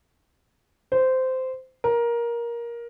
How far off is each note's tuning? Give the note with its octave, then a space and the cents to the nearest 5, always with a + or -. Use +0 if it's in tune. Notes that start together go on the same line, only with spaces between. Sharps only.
C5 -15
A#4 +15